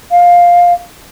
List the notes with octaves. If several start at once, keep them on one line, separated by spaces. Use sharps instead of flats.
F5